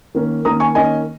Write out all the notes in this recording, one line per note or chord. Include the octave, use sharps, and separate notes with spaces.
D#3 A#3 C#4
D#3 A#3 C#4 A#5 D#6
G#5 C#6
D#3 A#3 C#4 D#5 G#5